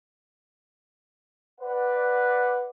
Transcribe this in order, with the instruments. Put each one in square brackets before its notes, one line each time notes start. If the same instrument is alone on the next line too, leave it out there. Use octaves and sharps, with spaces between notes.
[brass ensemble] B4 D5 F#5